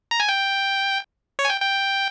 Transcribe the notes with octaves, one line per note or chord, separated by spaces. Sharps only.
A#5
G#5
G5
C#5
G#5
G5
G5